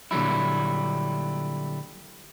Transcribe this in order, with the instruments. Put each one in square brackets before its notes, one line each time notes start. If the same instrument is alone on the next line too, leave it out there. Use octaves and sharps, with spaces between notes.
[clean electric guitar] A#2 D3 F#3 G3 E4